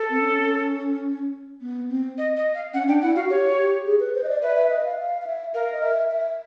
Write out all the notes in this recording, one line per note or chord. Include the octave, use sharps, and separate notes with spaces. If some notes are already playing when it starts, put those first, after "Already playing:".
Already playing: A4
C4
C#4
B3
C4
D#5
D#5
F5
C#4 F#5
D4 G5
E4 F#5
F#4 F5
G4 C#5
G4
G#4
B4
C5
D#5
D5
B4 E5
E5
D#5
E5
F5
F5
F5
E5
A#4 F5
D#5
E5
E5